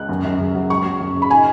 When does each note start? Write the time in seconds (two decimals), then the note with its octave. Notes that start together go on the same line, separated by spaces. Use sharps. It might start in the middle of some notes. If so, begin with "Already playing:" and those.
Already playing: C#2 F#6
0.09 F#2
0.24 F#2
0.39 C#3
0.55 F#3
0.70 C#2 C#6
0.85 F#3
1.00 F#2
1.16 C#3
1.22 B5
1.30 D#4 G#5